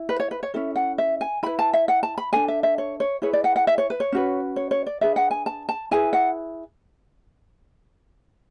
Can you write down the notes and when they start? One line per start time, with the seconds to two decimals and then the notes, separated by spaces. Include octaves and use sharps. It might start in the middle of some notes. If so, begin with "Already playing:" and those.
Already playing: E4
0.09 B4
0.20 C#5
0.31 B4
0.43 C#5
0.54 C#4 E4 A4 E5
0.76 F#5
0.98 E5
1.21 G#5
1.43 E4 B4 B5
1.59 A5
1.73 E5
1.88 F#5
2.03 A5
2.18 B5
2.33 D4 F#4 A4 G#5
2.48 E5
2.63 E5
2.78 C#5
3.00 C#5
3.22 E4 G#4 B4 C#5
3.33 D5
3.44 F#5
3.56 F#5
3.67 E5
3.78 C#5
3.90 B4
4.00 C#5
4.12 C#4 F#4 B4
4.56 C#5
4.71 C#5
4.86 D5
5.01 D4 G#4 B4 E5
5.16 F#5
5.31 G#5
5.46 A5
5.69 A5
5.91 E4 G#4 B4 G#5
6.13 F#5